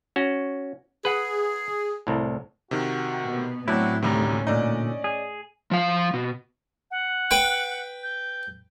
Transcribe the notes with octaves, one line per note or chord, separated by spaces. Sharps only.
C#4 F#4
G#4 B4 F#5
C2 A2
C3 D#3 F#4
B2 B3
A2 F#3 C4 D4 E4 F#4
D2 C3 D#3 G3 C#4 A#5
A#2 D3 D#4 D5 D#5
G#4
F3 F5
B2
F#5
B4 G5
G6